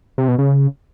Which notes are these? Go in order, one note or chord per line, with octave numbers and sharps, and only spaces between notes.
C3
B2
C#3